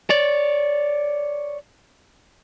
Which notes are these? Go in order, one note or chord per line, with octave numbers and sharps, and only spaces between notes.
C#5 D5